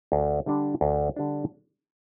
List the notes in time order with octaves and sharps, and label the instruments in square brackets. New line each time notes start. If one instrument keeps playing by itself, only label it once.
[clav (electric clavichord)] D2
D3 G3 D4
D2
D3 G3 D4